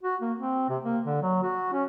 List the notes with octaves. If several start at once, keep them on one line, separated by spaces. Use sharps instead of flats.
F#4
A#3
C4
C3
A#3
D3
F#3
F#4
C#4